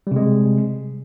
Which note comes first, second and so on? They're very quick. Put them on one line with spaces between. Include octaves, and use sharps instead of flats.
G3 C3 G#3